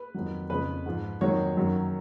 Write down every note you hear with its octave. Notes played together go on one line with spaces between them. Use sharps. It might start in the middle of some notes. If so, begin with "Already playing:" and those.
Already playing: B4
F2 D#3 F#3
F2 C#3 F3 B4
G#2 F3
F2 D#3 F#3 C#5
F#2 D#3 F#3